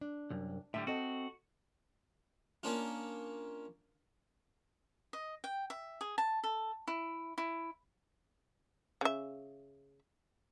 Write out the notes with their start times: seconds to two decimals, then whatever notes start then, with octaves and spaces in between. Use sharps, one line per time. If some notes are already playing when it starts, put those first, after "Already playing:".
0.01 D4
0.30 C2 F#2
0.74 A2 D3 G3 E5
0.87 C4 F#4 A4 D#5
2.63 A#3 C#4 D4 F4
5.13 D#5
5.44 G5
5.70 E5
6.01 G#4
6.18 A5
6.44 A4
6.88 E4
7.38 E4
9.01 C#3 E5